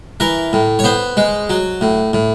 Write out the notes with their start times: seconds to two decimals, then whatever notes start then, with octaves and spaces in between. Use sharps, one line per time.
0.20 E3 A#4
0.53 A2
0.79 C#5
0.84 B3 C5
1.17 G#3
1.49 F#3
1.81 A2
2.13 A2